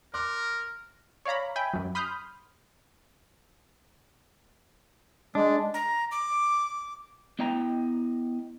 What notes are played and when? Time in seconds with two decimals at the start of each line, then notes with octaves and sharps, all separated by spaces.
0.14 A#4 C6 D6 F#6
1.25 C#5 D5 F5 A#5 B5
1.56 E5 G5 G#5 B5
1.73 F#2 F#3
1.95 B5 C6 D#6 F6 G6
5.35 G#3 D4
5.74 A#5
6.11 D6
7.39 B3 E4 D#5 G5 A#5